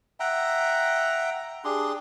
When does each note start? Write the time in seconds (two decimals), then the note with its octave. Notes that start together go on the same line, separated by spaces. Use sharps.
0.20 E5 F#5 G5 A#5
1.64 D4 G4 G#4 C6